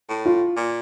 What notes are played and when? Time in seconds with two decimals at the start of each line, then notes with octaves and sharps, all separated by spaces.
0.09 A2
0.26 F4
0.57 A#2